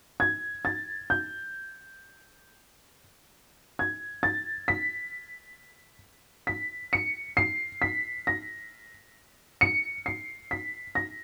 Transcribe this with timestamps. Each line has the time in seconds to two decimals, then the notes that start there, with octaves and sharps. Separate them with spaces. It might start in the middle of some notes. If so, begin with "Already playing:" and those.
0.20 G#6
0.65 A6
1.10 G6
3.79 G#6
4.23 A6
4.68 B6
6.47 B6
6.93 C#7
7.37 C7
7.82 B6
8.27 A#6
9.61 C#7
10.06 C7
10.51 B6
10.95 A#6